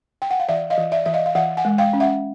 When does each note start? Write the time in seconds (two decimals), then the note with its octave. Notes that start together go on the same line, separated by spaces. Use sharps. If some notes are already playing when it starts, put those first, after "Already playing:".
0.22 G5
0.31 F#5
0.39 F5
0.49 E3 D5 E5
0.70 D#5 F5
0.78 E3
0.92 D5 E5
1.06 E3 E5
1.14 D#5 F5
1.26 F5
1.35 E3 E5 F#5
1.57 F#5 G#5
1.65 G#3
1.78 F5 G5
1.93 C#4
2.00 E5 F#5